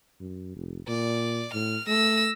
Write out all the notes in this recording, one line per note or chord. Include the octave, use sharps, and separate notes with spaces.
F#2
F1
A#2 D5
A2 F6
A3 E6 A#6